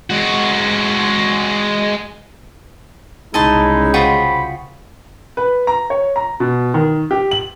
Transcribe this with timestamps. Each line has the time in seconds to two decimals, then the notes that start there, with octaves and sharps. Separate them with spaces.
0.10 G#3 F#4
3.34 C2 C#3 G#3 D#4 E4 D#5 A5 C6
3.94 F4 F#4 G#4 C5 G5 B5
5.37 B4
5.67 A#5
5.90 C#5
6.16 A#5
6.40 B2
6.74 D#3
7.11 G4
7.31 F#7